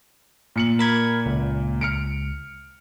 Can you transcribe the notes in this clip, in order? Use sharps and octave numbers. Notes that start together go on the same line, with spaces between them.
A#2 C#7 F#7
A#4 B5 G#6
C#2
F6 C#7 D7